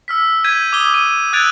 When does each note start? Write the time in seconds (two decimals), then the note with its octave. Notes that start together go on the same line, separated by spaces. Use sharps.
0.08 E6 F6 B6
0.44 G6 G#6 B6 D#7
0.73 D6 D#6 G#6 G7
0.94 D#7
1.33 E6 F#6 G#6 A6 D7 F7